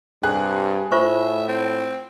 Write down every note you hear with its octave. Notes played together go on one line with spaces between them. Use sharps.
G2 C3 G#4 F#6
A2 F4 C5 E5 C#6
C4